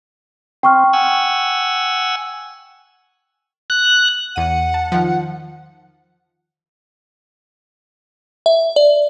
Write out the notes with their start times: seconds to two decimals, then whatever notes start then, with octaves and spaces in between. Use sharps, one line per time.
0.63 C4 G5 C#6 F6
0.93 F#5 G#5 E6
3.70 F#6
4.36 E2 F#5 D#7
4.74 A5
4.92 D#3 F3
8.46 E5
8.76 D5